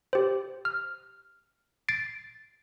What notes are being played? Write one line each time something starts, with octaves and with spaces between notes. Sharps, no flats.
G4 C5
F6
A6 C7 D7